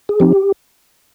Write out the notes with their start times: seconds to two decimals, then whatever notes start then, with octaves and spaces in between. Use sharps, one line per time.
0.09 G#4
0.20 F3 C4 D#4 G4